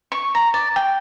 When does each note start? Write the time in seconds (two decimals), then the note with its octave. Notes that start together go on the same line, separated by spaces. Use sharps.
0.12 C#6
0.35 A#5
0.54 D5
0.76 G5